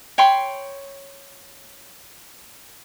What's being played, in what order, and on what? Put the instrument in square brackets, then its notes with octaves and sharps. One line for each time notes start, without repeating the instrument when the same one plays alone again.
[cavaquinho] C#5 G5 B5 C6